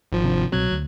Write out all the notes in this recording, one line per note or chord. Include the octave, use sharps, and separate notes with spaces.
G#1 F3
C3 C4 D4
C2 B2 F#3 C4 F#6 G#6
D2